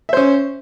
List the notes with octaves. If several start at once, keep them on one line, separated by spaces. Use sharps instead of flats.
C#4 C5 E5